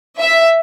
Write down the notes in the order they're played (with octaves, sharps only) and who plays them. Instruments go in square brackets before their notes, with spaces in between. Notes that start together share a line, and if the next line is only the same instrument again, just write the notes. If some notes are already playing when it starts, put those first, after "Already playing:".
[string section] E5